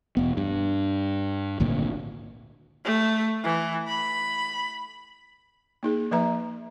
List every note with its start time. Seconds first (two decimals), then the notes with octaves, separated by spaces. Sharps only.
0.17 E1 B3
0.37 G2
1.60 G#1 D2 A#2 D3
2.85 A3
3.44 E3
3.88 B5
5.83 A#3 D#4 G#4
6.11 F3 A#3 B4 E5 A#5